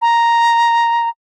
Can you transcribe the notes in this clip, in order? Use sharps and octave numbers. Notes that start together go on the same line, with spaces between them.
A#5